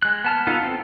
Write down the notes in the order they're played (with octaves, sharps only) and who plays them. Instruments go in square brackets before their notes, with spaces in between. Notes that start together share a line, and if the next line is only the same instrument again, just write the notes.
[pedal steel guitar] G#3 F#6
B3 A5 F6
B3 D#4 F4 A4
C4 A4